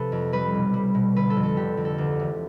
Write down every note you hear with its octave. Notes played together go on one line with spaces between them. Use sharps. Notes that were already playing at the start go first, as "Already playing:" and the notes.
Already playing: C3 F3 G4 A4 B4
F2
G3 B4
B1
G3
B2
D3 B4
A4
F2
A4
D3 G4
F2
A4
D2
E1